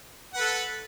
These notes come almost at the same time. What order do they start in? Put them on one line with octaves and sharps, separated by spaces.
F#5 B4 A4